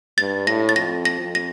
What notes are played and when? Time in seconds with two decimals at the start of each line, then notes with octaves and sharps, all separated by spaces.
0.18 G2 A6
0.47 A2 A#6
0.69 A6
0.76 F2 A#6
1.05 A#6
1.20 F2
1.35 A#6